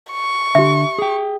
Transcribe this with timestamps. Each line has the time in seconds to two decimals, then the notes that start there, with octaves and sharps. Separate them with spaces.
0.11 C#6
0.55 D3 G4 E5
0.98 G#4 G5